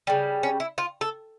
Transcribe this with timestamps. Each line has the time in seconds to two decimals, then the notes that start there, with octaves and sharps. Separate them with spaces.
0.07 C#3 G3
0.43 C#4
0.60 E4
0.78 F4
1.01 A4